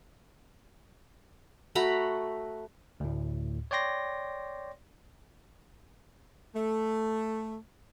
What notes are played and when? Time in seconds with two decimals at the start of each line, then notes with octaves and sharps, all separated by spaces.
1.75 A3 F#4 A#5 B5
3.00 D2 A2
3.71 C#5 D5 G5 C6 A#6
6.55 A3